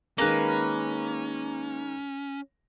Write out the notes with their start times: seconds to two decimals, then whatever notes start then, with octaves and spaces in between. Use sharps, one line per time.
0.18 D#3 G#3 A#3 C#4 A#4 B4